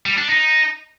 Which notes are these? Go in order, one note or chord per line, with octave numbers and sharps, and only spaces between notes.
G3
D4
D#4